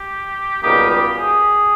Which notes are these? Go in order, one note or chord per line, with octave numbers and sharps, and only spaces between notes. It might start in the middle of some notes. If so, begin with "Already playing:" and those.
Already playing: G4
C#2 B2 G3 A#3 D#4 G4
G4
G#4